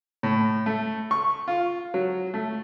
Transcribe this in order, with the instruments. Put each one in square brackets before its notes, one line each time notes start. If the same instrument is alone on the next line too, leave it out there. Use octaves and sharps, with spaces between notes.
[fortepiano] A2
A3
C#6
F4
F#3
A3